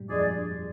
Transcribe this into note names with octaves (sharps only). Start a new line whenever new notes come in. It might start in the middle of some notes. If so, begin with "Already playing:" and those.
Already playing: G2 A#2 G3
F2 F3 G#3 D4 G#4 D5